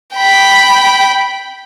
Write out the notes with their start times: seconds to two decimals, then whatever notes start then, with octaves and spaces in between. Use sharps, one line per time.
0.14 G5 B5